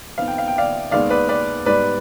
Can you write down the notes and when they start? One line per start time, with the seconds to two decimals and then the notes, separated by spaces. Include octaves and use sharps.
0.18 F2 D#3 B3 F5
0.28 G5
0.38 F5
0.48 G5
0.58 D5 F5
0.91 D#2 D#3 G#3 B3 D5 F5
1.10 B4 D5
1.29 B4 D5
1.66 G#2 G3 B3 B4 D5